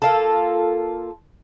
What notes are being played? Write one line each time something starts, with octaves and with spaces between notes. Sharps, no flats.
A#3 F4 A4